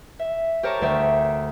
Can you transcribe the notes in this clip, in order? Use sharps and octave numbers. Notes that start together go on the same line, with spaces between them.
E5
G4 A#4 C5 C#5 A5 A#5
D2 G4 C5 E5 G5